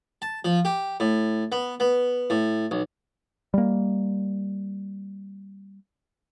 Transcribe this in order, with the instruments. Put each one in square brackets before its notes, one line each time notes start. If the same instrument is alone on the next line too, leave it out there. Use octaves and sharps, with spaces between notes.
[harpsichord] A5
F3
G4
A2
B3
B3
A2
B1
[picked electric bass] G3 A#3